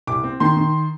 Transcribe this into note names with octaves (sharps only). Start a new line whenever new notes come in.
C2 D6
C4
D#3 C6
D#3